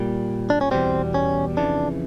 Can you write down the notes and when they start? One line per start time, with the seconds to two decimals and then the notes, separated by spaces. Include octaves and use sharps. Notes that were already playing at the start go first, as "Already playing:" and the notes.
Already playing: A#2 G3
0.50 D4
0.61 C#4
0.71 E2 B2 G3 C4
1.14 C#4
1.57 F2 C#3 E3 D4